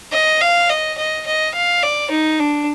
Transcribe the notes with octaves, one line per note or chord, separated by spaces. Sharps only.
D#5
F5
D#5
D#5
D#5
F5
D5
D#4
D4